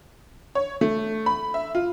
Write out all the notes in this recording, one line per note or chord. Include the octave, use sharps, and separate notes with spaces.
C#5
A3
B5
E5
F4